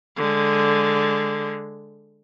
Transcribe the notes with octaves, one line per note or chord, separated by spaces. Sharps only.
D3 G#3